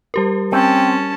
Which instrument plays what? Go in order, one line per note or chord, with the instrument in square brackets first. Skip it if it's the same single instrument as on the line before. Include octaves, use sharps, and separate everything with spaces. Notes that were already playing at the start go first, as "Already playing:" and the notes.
[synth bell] G3 G4 A#4
[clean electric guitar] C4 [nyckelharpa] C#4 A5 [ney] G5